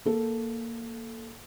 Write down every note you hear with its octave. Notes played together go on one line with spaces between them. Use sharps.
A#3 A4